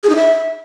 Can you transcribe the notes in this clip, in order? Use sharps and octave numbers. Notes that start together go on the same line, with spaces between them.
G#4
D#4
E5